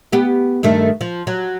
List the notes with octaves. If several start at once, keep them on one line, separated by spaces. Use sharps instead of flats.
B3 G4
G2 D#3 A3
F3
F#3